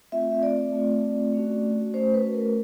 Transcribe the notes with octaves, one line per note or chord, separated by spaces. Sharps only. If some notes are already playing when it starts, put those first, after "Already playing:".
A3 C4 F4 E5
D5
A3 C4 F4
A3 C#4 F#4
A3 C#4 F#4 C5
B4
A#4